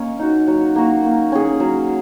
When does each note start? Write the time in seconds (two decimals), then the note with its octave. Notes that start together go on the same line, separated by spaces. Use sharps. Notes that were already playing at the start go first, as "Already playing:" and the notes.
Already playing: A#3 C#4 D#5
0.19 D#4 F#4
0.47 F#3
0.76 A#3 F#4
1.03 A#3
1.32 C#4 G#4
1.60 F#3